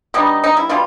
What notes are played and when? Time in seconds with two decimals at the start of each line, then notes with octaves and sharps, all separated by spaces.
0.14 D3 G3 B3 D#4
0.44 D#4
0.57 E4
0.69 B2 G3 F4